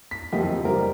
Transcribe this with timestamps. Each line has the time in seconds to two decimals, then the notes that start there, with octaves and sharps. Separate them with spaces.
0.11 B6
0.32 F#1 F2 F3 F4 G4 D#5
0.65 G3 A#4 C5